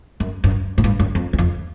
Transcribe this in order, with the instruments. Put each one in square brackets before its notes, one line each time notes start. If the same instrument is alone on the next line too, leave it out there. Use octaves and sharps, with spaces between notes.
[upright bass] F#2
F#2
G#2
G2
F#2
F2
E2
F2